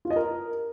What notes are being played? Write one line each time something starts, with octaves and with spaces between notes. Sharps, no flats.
F4
D#5
A#4